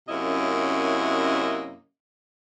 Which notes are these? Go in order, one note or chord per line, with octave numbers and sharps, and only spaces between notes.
F#2 C3 A#3 C#4 E4 D#5